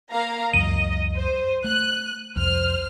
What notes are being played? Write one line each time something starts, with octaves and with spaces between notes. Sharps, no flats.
A#3 F5 A#5
C#2 F#2 E3 D#5 D#7
C5
A3 F#6
C2 F2 C5 F6